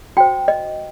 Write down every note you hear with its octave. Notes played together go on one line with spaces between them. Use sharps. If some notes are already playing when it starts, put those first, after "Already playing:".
F#4 C5 G5
D#5